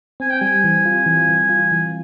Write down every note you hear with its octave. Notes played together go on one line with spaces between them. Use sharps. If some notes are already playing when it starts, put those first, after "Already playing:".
C4 G#5
G5
G3 G#5
E3
F4
E3
E3
F4
E3